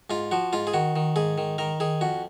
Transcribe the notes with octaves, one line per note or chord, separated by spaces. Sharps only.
G#2 F4
F3 F#4
G#2 F4
G#4
D#3 F#4
D#3
G#2 G#4
D#3
D#3 A#4
D#3 G#4
F2 F#4